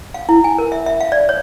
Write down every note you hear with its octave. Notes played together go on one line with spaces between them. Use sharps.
F5
E4
G#5
A#4
E5
E5
F5
D5
C#5